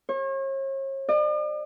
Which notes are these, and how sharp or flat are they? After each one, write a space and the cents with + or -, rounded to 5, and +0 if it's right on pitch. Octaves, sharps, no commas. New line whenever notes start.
C#5 -40
D5 +45